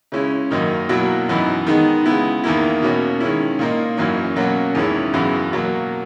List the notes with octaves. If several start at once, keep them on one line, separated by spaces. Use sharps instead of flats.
C#3 G#3 C#4 E4
F#2 D#3 A#3 D#4
B2 F#3 A#3 E4
F#2 E3 B3 D#4
D#3 G#3 B3 D#4
C#3 G#3 B3 E4
E2 D#3 A#3 E4
B2 A#3 C#4
D#3 G#3 C#4 E4
A#2 A#3 D#4
F#2 E3 A#3 C#4
B2 F#3 A#3 C#4
E2 D#3 G#3 C#4 E4
F#2 C#3 E3 B3
B2 F#3 A#3